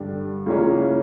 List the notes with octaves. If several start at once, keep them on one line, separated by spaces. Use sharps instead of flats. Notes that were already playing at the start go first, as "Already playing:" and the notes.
Already playing: G2 D3 G3 D4
C#2 C#3 E3 A#3 C#4